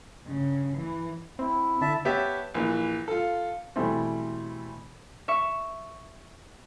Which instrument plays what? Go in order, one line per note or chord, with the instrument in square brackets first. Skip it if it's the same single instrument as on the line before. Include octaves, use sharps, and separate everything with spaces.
[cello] G2 C#3
E3
[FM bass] C4 [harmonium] E4
[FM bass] D3 [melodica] E5 A5
[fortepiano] B3 G4 C#5 E5 A5
A#1 E3
F4 A4
[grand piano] B2 E3 G3 A3 C4
[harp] E5 C#6 E6